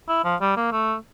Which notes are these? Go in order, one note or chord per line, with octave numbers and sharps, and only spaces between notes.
E4
F3
G3
A#3
A3